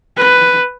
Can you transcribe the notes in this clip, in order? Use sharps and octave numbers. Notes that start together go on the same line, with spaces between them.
B4